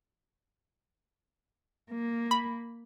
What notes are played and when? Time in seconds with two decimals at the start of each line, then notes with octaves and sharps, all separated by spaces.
1.91 A#3
2.31 B5